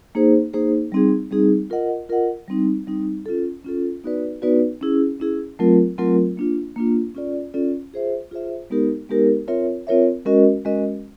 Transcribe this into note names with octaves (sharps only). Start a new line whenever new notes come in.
A#3 D#4 G#4 C5
A#3 D#4 G#4 C5
G3 C4 D#4 G#4
G3 C4 D#4 G#4
F4 A#4 D#5 F#5
F4 A#4 D#5 F#5
G3 C4 D#4
G3 C4 D#4
C#4 F4 A4
C#4 F4 A4
B3 D#4 F#4 B4 D5
B3 D#4 F#4 B4 D5
C#4 E4 G#4
C#4 E4 G#4
F#3 A3 C4 F4 A#4
F#3 A3 C4 F4 A#4
A#3 D4 F4
A#3 D4 F4
C#4 F4 A4 D5
C#4 F4 A4 D5
F4 G#4 C5 E5
F4 G#4 C5 E5
G#3 B3 D#4 G4 A#4
G#3 B3 D#4 G4 A#4
C4 F4 A#4 C#5 E5
C4 F4 A#4 C#5 E5
G#3 C#4 F#4 A#4 D#5
G#3 C#4 F#4 A#4 D#5